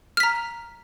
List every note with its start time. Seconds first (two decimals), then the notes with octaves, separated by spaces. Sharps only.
0.17 F6
0.20 B6
0.23 A#5